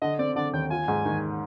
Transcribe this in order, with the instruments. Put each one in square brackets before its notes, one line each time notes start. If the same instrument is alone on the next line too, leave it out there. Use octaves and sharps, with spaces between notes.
[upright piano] D3 [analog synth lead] D#5
[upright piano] C4 [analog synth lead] D5
[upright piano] D3 [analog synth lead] D5
[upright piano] D#2 [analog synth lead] G5
[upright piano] F4 [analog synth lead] G#5
[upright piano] G#2
D#3